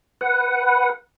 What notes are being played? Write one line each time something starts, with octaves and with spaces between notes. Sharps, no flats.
B4 F#5